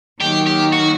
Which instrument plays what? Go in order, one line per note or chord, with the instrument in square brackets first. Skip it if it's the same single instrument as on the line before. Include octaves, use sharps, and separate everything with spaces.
[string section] D#3 F#3 A#3 [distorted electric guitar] G4
[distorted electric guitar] G4
F#4